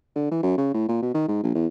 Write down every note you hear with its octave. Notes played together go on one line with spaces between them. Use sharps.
D3
E3
F#2
C#3
A2
A#2
B2
D#3
G#2
A#1
E2